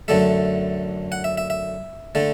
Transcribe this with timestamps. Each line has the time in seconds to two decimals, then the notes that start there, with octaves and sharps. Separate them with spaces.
0.08 F#2 D3 A3 E5
1.12 F#5
1.24 E5
1.38 E5
1.50 E5
2.15 D3 A3